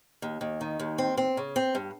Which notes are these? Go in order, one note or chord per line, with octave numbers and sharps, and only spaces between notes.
D#2
D#2
D#3
D#2
C4
C4
C#3
C4
G2